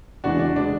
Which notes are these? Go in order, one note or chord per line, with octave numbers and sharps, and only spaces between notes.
E2 C#3 E3 G#3 D4 F#4
D4
C#3 G#3 D4